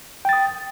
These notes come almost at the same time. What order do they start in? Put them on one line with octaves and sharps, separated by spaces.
G5 A6 D#6